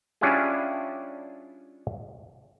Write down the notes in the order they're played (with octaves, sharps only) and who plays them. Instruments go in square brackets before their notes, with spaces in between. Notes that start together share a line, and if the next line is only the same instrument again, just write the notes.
[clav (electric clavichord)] G3 C#4 D4 E4 F4 G#4